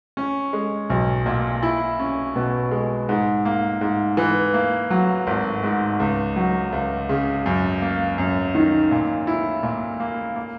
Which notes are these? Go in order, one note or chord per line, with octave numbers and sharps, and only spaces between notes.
C#4
G#3
B1
A#2
E4
C#4
B2
G#3
G#2
A#3
G#2
E3
A#3
F#3
G#1
G#2
C#2
F#3
C#2
C#3
F#2
A#3
F#2
D#3
A#2
E4
A#2
A#3
A#3